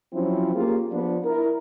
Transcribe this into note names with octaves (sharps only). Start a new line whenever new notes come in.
F3 F#3 C4 C#4 E4
A#3 C#4 F4 G4 G#4
F3 B3 D4
E4 A#4